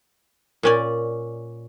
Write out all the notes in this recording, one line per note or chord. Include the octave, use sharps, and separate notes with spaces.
A#2 C#4 D5